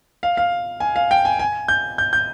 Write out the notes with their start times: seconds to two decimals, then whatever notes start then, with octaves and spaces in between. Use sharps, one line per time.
0.23 F5
0.37 F5
0.80 G#5
0.96 F5
1.11 G5
1.25 G#5
1.39 G#5
1.68 G6
1.98 G6
2.13 G6